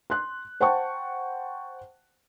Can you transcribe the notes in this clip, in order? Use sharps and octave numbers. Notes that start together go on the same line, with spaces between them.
C6 F#6
C5 F#5 G5 A5 C#6